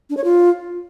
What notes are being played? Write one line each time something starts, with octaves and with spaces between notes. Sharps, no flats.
D4
C#5
F4